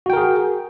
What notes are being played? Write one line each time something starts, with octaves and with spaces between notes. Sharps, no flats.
F#4 G#4 A#4 G5